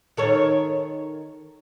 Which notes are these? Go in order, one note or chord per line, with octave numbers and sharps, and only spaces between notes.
D#3 A4 C#5